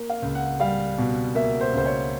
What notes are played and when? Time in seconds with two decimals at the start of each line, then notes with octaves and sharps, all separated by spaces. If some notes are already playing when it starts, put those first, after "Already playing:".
Already playing: A#3
0.10 F5
0.22 C#2
0.35 F#5
0.60 G3 F5
0.98 B2
1.35 A#3 E5
1.61 C5
1.73 C#2 C5
1.86 C#5